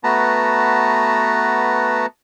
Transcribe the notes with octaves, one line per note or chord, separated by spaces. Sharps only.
A3 B3 F#4 B4 A5 A#5